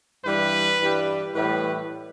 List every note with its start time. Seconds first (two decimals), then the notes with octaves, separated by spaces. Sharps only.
0.26 G2 E3 G3 B4
0.81 G2 E3 G3
1.35 A2 E3 G3 B4